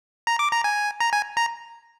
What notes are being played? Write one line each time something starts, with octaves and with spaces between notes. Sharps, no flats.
A#5
D6
A#5
G#5
A#5
G#5
A#5